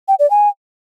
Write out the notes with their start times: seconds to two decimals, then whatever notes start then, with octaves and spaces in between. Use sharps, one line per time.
0.08 G5
0.19 D5
0.30 G#5